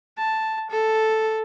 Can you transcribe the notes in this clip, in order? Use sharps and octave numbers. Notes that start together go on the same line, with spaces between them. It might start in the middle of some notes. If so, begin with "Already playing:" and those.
A5
A4